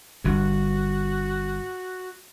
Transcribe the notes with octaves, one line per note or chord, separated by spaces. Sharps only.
G1 G2 F#4